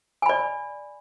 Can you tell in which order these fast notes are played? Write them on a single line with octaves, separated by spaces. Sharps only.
G#5 B5 D5